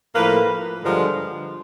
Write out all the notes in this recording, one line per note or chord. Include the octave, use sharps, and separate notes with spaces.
A2 F3 A#3 B4
G2 D3 F3 G#3 A#4